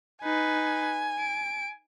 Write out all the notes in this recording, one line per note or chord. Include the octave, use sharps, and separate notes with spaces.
D#4 B4 G#5
D7